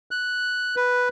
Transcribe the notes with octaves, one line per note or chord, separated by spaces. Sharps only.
F#6
B4